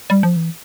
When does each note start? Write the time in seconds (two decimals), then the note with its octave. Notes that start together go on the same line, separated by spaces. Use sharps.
0.10 G3
0.23 F3
0.36 E3